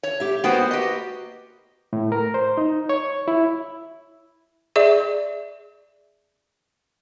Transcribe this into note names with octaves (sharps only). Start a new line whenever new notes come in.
C#5
G4 E5
A#3 B3 F#4 B4 C5 G5
G4 D#5
A2
A#4
C5
D#4
C#5
E4
G#4 D5 E5